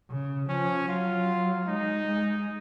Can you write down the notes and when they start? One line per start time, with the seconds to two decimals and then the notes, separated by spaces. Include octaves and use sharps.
0.10 C#3
0.49 F3 C#4
0.88 F#3 F4
1.67 G#3 D#4
2.07 G#3